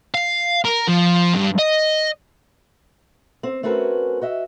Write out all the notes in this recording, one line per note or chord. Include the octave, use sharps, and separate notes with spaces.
F5
A#4
F3
G2
D#5
C4
A3 C4 C#4 F#4 A#4 B4
F#4 D#5 E5